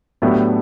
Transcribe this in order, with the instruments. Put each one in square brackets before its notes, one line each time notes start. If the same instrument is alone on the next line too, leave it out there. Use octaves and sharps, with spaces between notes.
[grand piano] A2 F#3 A3 D4 G4 [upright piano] B3